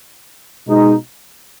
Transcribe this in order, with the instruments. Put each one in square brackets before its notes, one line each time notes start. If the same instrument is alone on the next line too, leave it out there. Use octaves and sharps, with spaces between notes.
[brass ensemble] B2 G#3 D#4